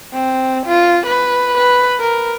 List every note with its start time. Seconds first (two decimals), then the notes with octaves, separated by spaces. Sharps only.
0.13 C4
0.67 F4
1.06 B4
1.57 B4
2.00 A#4